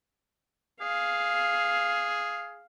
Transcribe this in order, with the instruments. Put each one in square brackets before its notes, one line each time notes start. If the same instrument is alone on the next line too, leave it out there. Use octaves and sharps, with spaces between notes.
[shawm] G#4 [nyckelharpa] F5